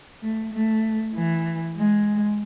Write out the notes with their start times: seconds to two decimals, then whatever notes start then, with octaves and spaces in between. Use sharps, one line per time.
0.22 A3
0.53 A3
1.15 E3
1.76 G#3